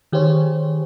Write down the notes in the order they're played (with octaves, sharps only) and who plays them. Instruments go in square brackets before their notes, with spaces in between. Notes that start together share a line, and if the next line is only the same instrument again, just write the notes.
[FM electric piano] D#3 G4 G#4 C5 C#5